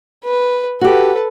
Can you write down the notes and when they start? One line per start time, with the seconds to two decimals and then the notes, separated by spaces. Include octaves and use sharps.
0.24 B4
0.81 F#4 G4 A4 B4